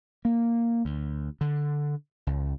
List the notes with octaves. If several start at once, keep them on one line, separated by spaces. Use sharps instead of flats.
A#3
D2
D3
C#2